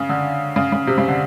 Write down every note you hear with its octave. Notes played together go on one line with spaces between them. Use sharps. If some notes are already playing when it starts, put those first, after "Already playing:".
Already playing: C#3
D3
C#3
C#3
C3
C#3
D3